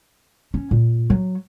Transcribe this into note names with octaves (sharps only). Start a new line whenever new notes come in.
C#4
A#2
F#3